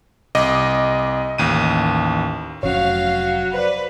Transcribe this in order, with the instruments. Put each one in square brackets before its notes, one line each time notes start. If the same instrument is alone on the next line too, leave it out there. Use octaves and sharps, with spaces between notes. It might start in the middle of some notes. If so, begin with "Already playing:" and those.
[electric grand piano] C2 D#5 D6
A1 D#2 D#7
[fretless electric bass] F1 F3 C#4 [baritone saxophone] F#3 [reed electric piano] C#5 [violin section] F5
[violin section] B4 [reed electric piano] C5 D5